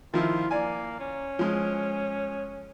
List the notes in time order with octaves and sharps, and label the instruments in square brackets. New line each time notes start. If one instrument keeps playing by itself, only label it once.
[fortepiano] D#3 F3 E4 [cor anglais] F4
[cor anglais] A#3 [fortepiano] D5 G#5
[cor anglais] C#4
[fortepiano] F3 G#3